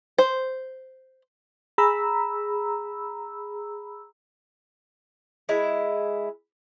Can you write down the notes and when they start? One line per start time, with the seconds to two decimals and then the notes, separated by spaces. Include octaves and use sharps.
0.18 C5
1.78 G#4 A#5 B5 E6
5.49 G#3 E4